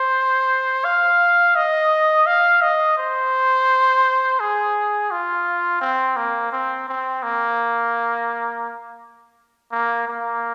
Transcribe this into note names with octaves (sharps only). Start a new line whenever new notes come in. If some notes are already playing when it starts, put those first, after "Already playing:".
Already playing: C5
F5
D#5
F5
D#5
C5
G#4
F4
C4
A#3
C4
C4
A#3
A#3
A#3